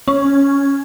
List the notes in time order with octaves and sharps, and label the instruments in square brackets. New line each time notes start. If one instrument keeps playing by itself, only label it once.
[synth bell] C#4